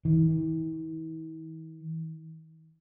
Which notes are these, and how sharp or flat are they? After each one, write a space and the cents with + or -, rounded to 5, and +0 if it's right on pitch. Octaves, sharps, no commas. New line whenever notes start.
E3 -45